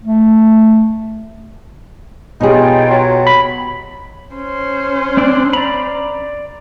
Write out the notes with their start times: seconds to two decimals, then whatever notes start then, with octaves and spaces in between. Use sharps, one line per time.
0.04 A3
2.40 B2 D#4 F4 G4 G#4 C#5 G5
2.91 F#3
3.27 B5
4.34 C#4 C5
5.17 C4 D4 D5
5.53 D5 A#5 B5